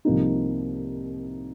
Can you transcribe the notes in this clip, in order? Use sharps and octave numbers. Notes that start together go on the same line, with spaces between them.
C2 C3 F3 A#3 D#4